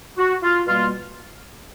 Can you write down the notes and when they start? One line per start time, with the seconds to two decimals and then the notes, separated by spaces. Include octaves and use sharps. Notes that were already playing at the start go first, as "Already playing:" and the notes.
0.17 F#4
0.42 F4
0.67 B2 G3 A#3 F4